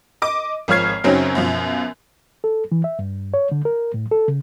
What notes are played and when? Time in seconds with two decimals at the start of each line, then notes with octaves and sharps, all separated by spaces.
0.22 D#5 D6
0.68 G#1 F3 C#5 F6 G#6 C7
1.04 F#2 C#3 F#3 C4 C#4 D#4
1.35 F#2 B2 F3
2.44 A4
2.72 E3
2.84 E5
2.99 G2
3.34 C#5
3.52 D3
3.65 A#4
3.94 A2
4.11 A4
4.28 C#3